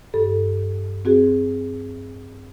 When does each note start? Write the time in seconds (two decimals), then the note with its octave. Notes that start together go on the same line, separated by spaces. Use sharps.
0.14 G2 A4
1.05 C4 F#4 G#4